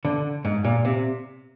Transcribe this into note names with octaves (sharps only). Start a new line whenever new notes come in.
D3
G#2
A#2
C3